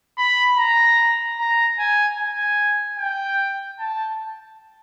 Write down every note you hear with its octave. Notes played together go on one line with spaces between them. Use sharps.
B5
A#5
A#5
G#5
G#5
G5
A5